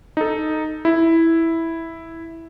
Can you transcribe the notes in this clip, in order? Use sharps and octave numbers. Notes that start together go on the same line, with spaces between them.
D#4 A4
E4